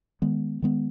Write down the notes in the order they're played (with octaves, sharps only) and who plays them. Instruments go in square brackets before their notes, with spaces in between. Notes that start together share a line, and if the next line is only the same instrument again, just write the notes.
[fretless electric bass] D#3 G#3 B3
D#3 G#3 B3